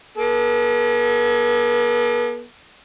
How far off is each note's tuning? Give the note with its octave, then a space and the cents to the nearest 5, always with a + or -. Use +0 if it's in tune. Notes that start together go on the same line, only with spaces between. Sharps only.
B3 -45 A4 -30